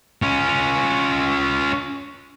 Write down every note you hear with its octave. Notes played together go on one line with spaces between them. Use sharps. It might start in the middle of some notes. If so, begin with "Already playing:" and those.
C#4 F4